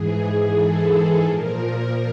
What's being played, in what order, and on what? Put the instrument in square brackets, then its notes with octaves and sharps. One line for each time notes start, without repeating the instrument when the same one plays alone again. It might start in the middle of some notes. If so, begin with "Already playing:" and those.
Already playing: [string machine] G#2 E3 G#4
A4
A#2 F3 A#4